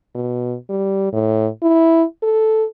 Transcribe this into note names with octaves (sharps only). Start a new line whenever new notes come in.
B2
G3
A2
E4
A4